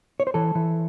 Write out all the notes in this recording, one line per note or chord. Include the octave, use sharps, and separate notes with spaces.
C#5
C5
E3 A4
E3